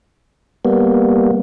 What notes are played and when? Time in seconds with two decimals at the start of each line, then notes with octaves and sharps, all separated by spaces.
0.65 G3 A#3 B3